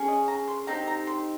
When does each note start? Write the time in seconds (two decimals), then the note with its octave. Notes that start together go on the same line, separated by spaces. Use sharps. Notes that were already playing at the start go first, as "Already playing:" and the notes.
Already playing: C#4 G#4
0.08 D#5
0.28 A#5
0.48 C6
0.67 C4 D#4 G4 A#5
0.87 A#5
1.07 C6